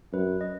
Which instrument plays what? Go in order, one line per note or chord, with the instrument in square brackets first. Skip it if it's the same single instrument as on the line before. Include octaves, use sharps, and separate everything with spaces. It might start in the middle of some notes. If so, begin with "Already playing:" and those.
[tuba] F#2 [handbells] B4
[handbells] D#5